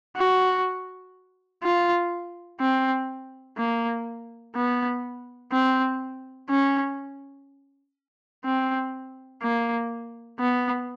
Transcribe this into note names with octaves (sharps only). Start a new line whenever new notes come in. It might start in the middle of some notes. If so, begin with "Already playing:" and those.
F#4
F4
C4
A#3
B3
C4
C#4
C4
A#3
B3